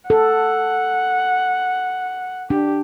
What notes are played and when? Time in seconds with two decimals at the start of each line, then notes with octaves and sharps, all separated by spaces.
0.10 A4 F#5
2.50 D4 G4